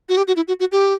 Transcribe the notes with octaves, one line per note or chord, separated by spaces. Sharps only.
F#4
G4
F#4
E4
F#4
F#4
G4